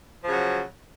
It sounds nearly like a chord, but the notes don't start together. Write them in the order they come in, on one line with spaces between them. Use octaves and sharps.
F3 C#3 F#3